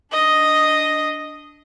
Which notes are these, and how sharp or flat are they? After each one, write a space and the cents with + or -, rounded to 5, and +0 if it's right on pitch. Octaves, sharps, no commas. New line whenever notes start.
D4 +0 D#5 +0